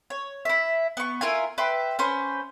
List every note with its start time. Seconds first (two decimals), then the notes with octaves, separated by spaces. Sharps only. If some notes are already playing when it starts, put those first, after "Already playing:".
0.10 C#5
0.45 E4 E5
0.97 B3 C#6
1.21 E4 F4 A#4 G#5
1.58 B4 E5 G5 C6
1.99 C#4 B4 C5